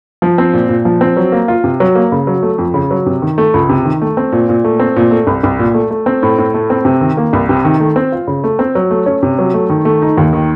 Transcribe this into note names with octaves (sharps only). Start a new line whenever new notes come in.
F3
C4
A#2
A#2
F3
C4
F#3
A#3
F4
C3
F#3
A#3
C#3
F#3
A3
F2
C#3
F#3
C3
D#3
A3
C#2
C3
D#3
A3
C4
A#2
A#2
A3
C4
A#2
A3
C2
C2
A#2
A3
A3
C4
A2
A2
A3
C4
C3
D#3
A#3
C2
C3
D#3
A3
C4
F4
C#3
A3
C4
F#3
A3
C#4
C3
F#3
A3
D#3
A3
D#4
D#2
D#3